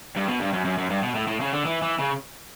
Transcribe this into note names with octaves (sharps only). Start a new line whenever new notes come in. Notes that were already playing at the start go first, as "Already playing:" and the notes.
G2
B2
G2
F#2
F#2
F#2
G2
B2
A2
A2
C#3
D3
E3
E3
C#3